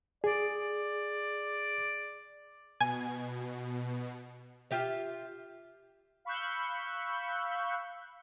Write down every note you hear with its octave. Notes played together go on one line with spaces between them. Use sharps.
G#4 D5
B2 G#5
F4 G4 E5
F5 B5 C#6 E6 F#6 G6